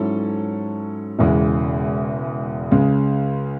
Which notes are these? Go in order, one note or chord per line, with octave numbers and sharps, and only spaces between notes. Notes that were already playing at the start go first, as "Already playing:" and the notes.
Already playing: G#2 F#3 C#4 E4 A4
E1 E2 C#3 E3 G#3
C#2 C#3 G#3